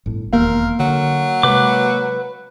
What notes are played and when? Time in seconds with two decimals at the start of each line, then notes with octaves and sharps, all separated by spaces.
0.06 G1 A2
0.33 E1 D#2 A#3 B3 A#4 F5
0.79 D3 F#3
1.43 C3 G#3 B4 D6